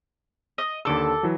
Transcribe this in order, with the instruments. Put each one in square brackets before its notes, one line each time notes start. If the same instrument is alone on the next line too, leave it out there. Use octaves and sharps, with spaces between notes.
[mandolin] D#5
[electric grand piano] D#2 D3 E6 [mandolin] A4 D6
[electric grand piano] E3 F#3